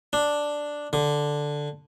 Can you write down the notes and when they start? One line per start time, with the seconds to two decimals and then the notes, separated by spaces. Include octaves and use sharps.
0.13 D4
0.93 D3